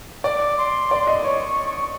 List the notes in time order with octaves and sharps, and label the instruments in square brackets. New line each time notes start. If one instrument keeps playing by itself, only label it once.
[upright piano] D5 [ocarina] D6
[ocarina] C6
[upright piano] D5
D#5
[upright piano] C#5 [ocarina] C#6